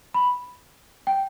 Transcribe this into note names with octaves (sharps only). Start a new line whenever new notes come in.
B5
G5